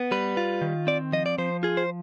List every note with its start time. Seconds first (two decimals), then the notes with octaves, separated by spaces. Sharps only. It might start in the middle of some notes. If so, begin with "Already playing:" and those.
Already playing: B3
0.11 G3 B4
0.37 F4
0.62 D#3
0.87 C4 D5
1.13 F3 D#5
1.26 D5
1.38 F3 C5
1.63 F4 G#4
1.77 C5